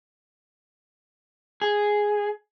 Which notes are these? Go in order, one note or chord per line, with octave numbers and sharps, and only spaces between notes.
G#4